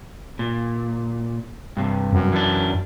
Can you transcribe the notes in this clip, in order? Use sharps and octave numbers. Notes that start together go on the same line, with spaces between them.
A#2
G2 C3
F#2
E3 D4